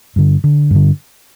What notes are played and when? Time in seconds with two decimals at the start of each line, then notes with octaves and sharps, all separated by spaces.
0.16 G2 D3
0.44 D3
0.71 G2 D3